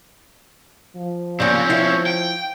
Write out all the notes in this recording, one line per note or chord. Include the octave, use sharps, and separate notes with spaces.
F3
A#2 C#3 C4 C#4
E4 F5
G5